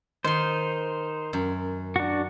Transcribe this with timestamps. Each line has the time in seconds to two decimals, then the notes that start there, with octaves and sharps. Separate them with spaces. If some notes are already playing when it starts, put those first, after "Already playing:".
0.25 D#3 D#4 C5 C6
1.33 F#2
1.96 D4 F#4